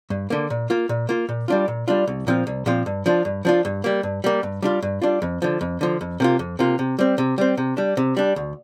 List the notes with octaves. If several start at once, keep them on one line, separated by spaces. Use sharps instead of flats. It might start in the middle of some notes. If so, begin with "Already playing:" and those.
G2
D3 A#3
A#2
A#3 F4
A#2
A#3 F4
A#2
G3 D4 F4
A#2
G3 D4 F4
C2
A#2 F3 C4 F4
C2
A#2 F3 C4 F4
G2
F3 D4 F4
G2
F3 D4 F4
G2
G3 A#3
G2
G3 A#3
G2
G3 D4 F4
G2
G3 D4 F4
F2
D3 F3
F2
D3 F3
F2
C3 A#3 F4
F2
C3 A#3 F4
C3
G3 C4
C3
G3 C4
C3
G3 D4
C3
G3 D4
D2